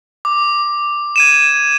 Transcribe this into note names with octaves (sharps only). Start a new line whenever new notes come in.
D6
G#6 D#7 E7